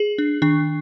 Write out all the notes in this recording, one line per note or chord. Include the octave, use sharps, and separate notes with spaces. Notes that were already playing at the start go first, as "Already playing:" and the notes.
Already playing: G#4
D4
D#3 D4